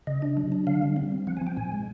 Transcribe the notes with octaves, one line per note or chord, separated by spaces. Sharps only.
C#3 D#5
D4
F#3
D4
D3 F5
G3
C4
C4
F3 F#5
G#5
F3
G5
A#2 G#5
G#3